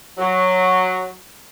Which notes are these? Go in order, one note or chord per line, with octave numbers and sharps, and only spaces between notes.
F#3